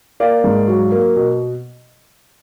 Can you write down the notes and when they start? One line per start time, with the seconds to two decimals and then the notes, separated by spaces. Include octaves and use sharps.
0.20 A#3 D5 F5
0.44 G#2
0.68 F#3
0.92 A#3
1.16 B2